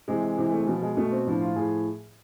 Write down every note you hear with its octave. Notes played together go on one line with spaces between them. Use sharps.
C3 E3 G#3
C3 E3
A3
G#3
B2 F3
G#3
B2 A3
C4
A2 F3 D4
F4
A2 F3 G#4